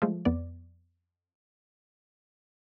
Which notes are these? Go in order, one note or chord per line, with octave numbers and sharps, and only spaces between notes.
F3 G#3 A3
F2 B3 D5